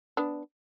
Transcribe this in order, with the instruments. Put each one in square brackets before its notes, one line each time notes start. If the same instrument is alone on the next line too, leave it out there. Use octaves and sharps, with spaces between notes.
[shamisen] B3 D4